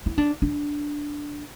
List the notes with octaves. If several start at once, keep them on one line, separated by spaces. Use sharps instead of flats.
E4
D4
D4